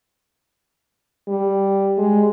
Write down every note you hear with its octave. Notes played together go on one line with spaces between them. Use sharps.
G3
G#3